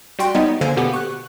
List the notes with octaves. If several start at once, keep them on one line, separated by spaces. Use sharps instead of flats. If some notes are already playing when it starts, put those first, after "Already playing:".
G3 F#4 G5 C6
G3 B3 D#4 C#5 D#5
D3 A#3 C5 G#5 E6
B2 D3 B3 G4 D6
C#6 F#6